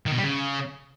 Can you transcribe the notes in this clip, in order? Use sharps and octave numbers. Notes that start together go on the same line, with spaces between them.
D#3
B2
G3
C#3